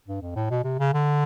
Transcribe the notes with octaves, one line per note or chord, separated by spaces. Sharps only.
G2
F2
A2
B2
C3
C#3
D3